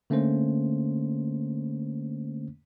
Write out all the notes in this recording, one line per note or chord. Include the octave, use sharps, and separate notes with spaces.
D3 A3 A#3 C#4 C5